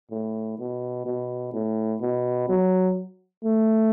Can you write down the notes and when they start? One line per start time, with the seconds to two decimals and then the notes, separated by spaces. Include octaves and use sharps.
0.11 A2
0.58 B2
1.06 B2
1.53 A2
2.01 B2
2.49 F#3
3.44 A3